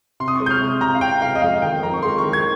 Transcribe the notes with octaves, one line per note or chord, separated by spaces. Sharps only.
C3 C6
D#6
G#3 C#6
G6
F6
C3
C3 A#5
F5
C3 G5
G#3 F5
D#5
F2 F5
D#3 G5
F2 A#5
C#6
G#3 C6
C#6
D#3
G#6